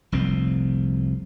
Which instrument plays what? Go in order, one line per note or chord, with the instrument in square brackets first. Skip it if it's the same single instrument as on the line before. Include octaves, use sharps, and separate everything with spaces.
[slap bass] F1 C2 A#2 C4